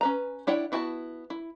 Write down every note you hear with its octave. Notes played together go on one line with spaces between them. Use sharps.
C#4 B4 A#5
D4 E4 C#5 F#5 G5
B3 E4 F#4 G5 A5
E4